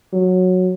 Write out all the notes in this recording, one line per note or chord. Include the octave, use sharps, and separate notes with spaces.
F#3